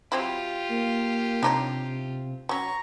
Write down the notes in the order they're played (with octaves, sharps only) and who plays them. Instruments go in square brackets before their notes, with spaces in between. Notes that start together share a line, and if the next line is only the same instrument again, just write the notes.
[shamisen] F#3 C4 E4 [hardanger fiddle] F4 G4
[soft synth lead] A#3
[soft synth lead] C3 [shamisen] D4 D#4 C#5
[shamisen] F#3 C#4 [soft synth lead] A#5 [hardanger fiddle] C#6